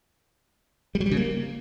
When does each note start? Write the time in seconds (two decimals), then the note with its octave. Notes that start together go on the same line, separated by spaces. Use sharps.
0.95 G3
1.00 F#3
1.06 G3
1.11 C#3
1.17 A#3